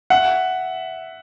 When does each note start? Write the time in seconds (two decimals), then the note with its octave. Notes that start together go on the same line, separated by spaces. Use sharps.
0.10 E5 F#5